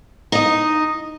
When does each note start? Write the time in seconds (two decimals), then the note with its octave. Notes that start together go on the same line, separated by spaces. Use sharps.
0.32 D#4 D#5